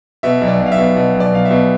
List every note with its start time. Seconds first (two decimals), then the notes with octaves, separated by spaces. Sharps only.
0.23 B2 E5
0.41 B1
0.48 D5
0.60 B1
0.66 F5
0.72 E5
0.78 B2
0.96 B2
1.14 B1
1.20 D5
1.32 B1 F5
1.45 E5
1.50 B2